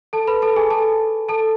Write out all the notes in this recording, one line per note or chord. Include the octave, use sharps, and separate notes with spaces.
A4 A5
B4 B5
A4 A5
G#4 G#5
A4 A5
A4 A5